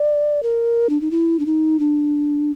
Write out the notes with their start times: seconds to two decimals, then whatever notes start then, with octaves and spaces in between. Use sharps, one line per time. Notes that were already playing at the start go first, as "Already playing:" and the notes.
Already playing: D5
0.43 A#4
0.90 D4
1.01 D#4
1.11 E4
1.40 D4
1.46 D#4
1.79 D4